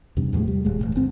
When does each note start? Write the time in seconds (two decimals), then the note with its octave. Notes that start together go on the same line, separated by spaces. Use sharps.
0.17 E2 G2 C3
0.33 E2 A2 F3 G#3
0.48 G3
0.65 D#1 G#3
0.79 E1 C#2 A2
0.95 G1 C4